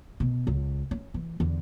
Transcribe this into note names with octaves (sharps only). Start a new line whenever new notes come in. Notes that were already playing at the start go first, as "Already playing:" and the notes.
B2
C#2
C#4
E3
E2 D3